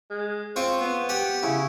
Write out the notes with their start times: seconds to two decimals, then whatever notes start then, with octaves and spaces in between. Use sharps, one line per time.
0.11 G#3
0.56 C4 F4 C#5
0.81 B3
1.09 G4 F#5
1.43 C#3 E4